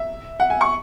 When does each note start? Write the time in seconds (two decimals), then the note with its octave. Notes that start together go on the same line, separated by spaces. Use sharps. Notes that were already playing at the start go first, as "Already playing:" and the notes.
Already playing: E5
0.40 F#5
0.50 G#5
0.61 C#6